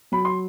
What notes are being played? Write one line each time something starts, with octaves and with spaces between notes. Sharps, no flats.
F#3 B5
C6